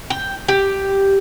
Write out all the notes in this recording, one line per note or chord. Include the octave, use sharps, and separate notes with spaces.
G5
G4